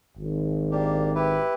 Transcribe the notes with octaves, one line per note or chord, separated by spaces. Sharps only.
G#1
A#3 D4 G4
E4 G4 B4